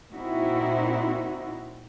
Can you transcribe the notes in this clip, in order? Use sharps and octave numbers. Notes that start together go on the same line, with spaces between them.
A#2 C4 D#4 E4 F#4